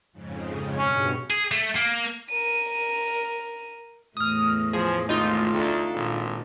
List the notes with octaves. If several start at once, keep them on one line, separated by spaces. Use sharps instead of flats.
F2 G#2 C#3
G2 B2 C#4
G#4
A3
A#3
A#4 D#7
E2 A2 A3 D#6 F6
F3 G#4
G#1 D#4 F4
D2 D4 A4
G#1 A#2